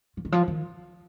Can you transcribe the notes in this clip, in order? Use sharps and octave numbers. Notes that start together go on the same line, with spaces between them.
F3
D#3
F3
D#3